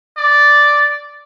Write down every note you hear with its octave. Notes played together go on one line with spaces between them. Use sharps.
D5